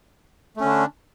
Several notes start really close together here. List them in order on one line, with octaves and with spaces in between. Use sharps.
A3 C#4 D3 D4